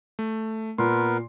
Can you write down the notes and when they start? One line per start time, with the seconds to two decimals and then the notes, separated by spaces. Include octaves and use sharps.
0.19 A3
0.78 A#2 B3 A#4 B4 C6